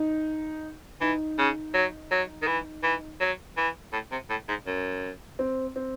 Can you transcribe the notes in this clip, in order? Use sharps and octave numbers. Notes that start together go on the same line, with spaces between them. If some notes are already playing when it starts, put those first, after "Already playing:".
Already playing: D#4
E3 D#4
C#3
F#3
F#3
D#3
E3
E3
F#3
E3
A2
C3
A2
G#2
F#2
C4
C4